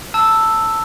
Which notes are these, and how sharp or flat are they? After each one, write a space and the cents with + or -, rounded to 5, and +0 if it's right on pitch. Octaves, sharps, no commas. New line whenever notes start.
A5 +15 E6 +0